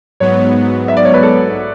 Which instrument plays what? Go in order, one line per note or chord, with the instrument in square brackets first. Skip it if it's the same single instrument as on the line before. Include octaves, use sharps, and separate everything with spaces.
[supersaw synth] G#2 F#3 B3 [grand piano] C#5
[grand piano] E5
D5
C#5
B4
A4